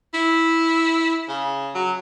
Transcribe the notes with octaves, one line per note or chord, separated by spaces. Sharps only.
E4
C#3
F#3